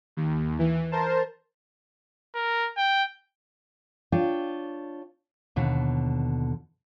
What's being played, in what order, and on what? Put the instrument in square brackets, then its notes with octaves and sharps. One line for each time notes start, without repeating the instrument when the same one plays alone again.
[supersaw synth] D#2
E3
A#4 C5 A5
[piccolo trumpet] A#4
G5
[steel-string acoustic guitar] D4 F4 C#5 G5
D#2 B2 D3